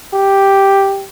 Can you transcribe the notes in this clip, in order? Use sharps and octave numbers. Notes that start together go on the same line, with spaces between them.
G4